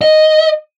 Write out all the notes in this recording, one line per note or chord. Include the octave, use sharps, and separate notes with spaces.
D#5